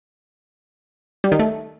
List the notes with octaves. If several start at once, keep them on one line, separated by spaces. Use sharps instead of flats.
G3
D#3
A3